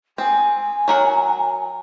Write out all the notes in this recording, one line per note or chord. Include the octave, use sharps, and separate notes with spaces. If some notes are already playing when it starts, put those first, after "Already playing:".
C4 G#5
F#3 A#4 F#5